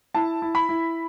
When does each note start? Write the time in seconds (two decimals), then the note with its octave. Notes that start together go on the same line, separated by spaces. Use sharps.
0.15 E4 A5
0.42 E4
0.55 B5
0.69 E4